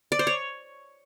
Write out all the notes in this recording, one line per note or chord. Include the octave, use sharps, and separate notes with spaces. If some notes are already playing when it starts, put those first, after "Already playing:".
D5
C5
C#5